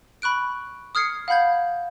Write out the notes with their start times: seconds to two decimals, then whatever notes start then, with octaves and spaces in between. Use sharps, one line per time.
0.22 B5 C#6 F#6 D7
0.95 D#6 F6 G#6 C7 C#7
1.28 F5 F#5 B5 G6 G#6